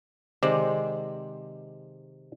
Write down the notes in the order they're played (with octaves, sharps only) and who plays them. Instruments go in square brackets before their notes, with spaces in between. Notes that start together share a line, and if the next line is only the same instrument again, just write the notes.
[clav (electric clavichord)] C3 C5 D5 [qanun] D#3 G#3